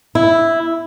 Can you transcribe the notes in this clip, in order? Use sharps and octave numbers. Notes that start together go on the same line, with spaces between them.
E4